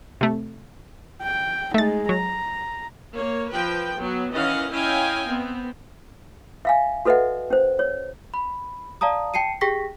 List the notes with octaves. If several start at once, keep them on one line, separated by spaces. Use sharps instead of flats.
C3 A3
G5
G#3 A3 D#4 A6
F#3 A#5
A#3 C#5
F3 B4 G5
F#3 B3
D#3 E3 C#4 D#5 F5 F#5
C#4 E4 D#5 F5 G5 G#5
B3 C4
E5 F5 G#5
F#4 A4 B4 D#5 E5 F#5
C#4 C5
C#5
B5
D5 F5 A5 A#5 D#6
G5 A5 C7 C#7 D#7
G4 G#4 G5 C#6 A#6 B6